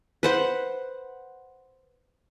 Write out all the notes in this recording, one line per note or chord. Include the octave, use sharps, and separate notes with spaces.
B4 C5 F#5